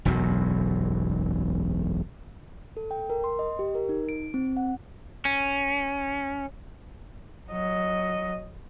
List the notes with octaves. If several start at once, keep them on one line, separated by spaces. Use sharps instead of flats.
E1 B1 F#2 F#3
A4
G5
A#4
C6
D#5
G4
A#4
D#4
D7
C4
F#5
C#4
F#3 D#5